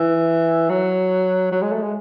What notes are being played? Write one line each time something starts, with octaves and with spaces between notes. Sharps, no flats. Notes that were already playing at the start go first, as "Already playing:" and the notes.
Already playing: E3
F#3
F#3
G#3
A3
G#3